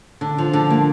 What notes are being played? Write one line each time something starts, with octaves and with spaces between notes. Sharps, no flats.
D3
F3
D3
A#3